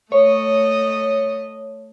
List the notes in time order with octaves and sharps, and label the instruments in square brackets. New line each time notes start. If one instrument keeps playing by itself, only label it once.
[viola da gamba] A3 D#5 [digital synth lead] C#5